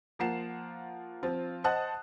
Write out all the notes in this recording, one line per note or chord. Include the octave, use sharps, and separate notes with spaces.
F3 A#3 F4 F#5 C7 E7
F3 C4 F4
C5 D#5 F#5 A5 D#6 F#6